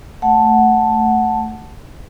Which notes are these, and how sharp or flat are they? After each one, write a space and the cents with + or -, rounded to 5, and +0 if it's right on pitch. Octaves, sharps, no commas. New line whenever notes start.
A3 +0 F#5 +0 A5 +0